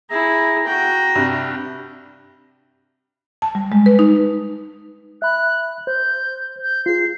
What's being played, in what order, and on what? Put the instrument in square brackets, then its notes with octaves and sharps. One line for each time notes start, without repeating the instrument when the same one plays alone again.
[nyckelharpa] E4 G#4 [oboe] A#5
[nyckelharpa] F#4 G5 [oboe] A#5
[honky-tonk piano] G2 C3
[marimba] A5
G3
G#3
B4
D#4
[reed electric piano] E5 B5 [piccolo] F#6
[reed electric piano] C5 [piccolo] G6
[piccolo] G6
[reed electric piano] F4 G#4 [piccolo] C7